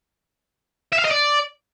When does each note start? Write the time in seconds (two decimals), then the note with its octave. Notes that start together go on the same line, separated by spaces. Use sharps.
0.93 E5
0.99 F5
1.05 D#5
1.11 D5